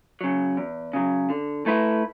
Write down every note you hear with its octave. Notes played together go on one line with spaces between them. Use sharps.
C#3 F#3
E2
C#3 F#3
D3
A3 E4 B4